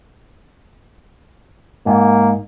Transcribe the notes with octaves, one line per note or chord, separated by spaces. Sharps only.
G#2 A#3